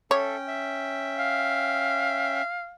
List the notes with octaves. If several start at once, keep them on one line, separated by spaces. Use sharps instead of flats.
C#4 A4 C#5 E5 G5
E5
F5